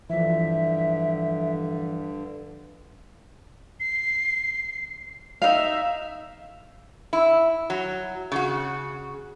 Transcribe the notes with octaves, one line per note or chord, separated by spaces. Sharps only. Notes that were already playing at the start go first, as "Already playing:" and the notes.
G2 D3 E3 F3 E5
C7
D#4 E5 F5
E4
F#3
C#3 F#4